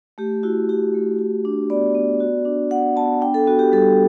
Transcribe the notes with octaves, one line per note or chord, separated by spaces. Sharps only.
A3 G4
E4 F#4
E4 G4
A3
F#4
D4
B3 D5
B3
F#4
D4
B3 F#5
B3 A5
D4 G5
A4
B3 F#4
G4
G3 A4